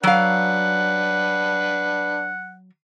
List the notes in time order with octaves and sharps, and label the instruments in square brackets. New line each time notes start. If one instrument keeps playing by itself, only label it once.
[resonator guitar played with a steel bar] F#3 F5 [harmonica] D4 B4 [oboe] F#5